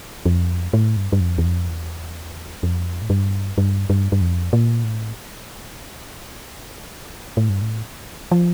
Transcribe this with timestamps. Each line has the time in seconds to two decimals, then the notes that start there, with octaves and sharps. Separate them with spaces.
0.26 F2
0.73 A2
0.97 G2
1.12 G2
1.20 F2
1.38 E2
1.45 F2
1.68 E2
2.63 F2
3.02 A2
3.10 G2
3.58 G2
3.90 G2
4.12 G2
4.21 F2
4.53 A#2
4.84 A2
7.37 A2
7.49 G2
7.62 A2
8.31 F3